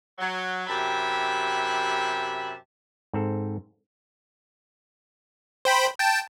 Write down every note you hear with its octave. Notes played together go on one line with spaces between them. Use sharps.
F#3
F#2 C3 G4 E5 A5 B5
G#2 C4 A4
C5 G5 B5
G5 A5